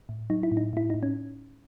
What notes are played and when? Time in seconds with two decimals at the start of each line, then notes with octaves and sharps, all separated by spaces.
0.09 A2
0.30 F#3 D#4
0.43 E4
0.52 A2
0.57 D#4
0.73 A2 E4
0.90 A2 D#4
1.03 C#4